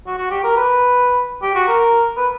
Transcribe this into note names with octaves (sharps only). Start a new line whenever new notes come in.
F#4
F#4
G4
A#4
B4
G4
F#4
A#4
B4